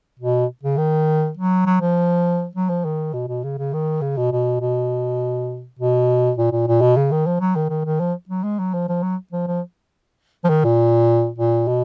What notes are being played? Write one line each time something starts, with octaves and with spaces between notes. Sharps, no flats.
B2
C#3
D#3
F#3
F#3
F3
F#3
F3
D#3
B2
B2
C#3
C#3
D#3
C#3
B2
B2
B2
B2
A#2
A#2
A#2
B2
C#3
D#3
F3
F#3
D#3
D#3
D#3
F3
F#3
G#3
F#3
F3
F3
F#3
F3
F3
F3
D#3
A#2
A#2
B2